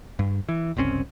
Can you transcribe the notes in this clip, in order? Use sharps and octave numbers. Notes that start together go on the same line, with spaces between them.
G2
E3
F#1 C2 C4 C#4